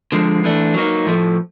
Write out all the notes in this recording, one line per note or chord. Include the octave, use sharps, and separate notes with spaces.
D3 F3 G#3
E3 A3 D4
F#3 A#3 D#4
A2 F3 A3